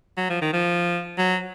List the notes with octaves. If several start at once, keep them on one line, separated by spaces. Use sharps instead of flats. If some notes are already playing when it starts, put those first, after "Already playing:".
F#3
F3
D#3
F3
F#3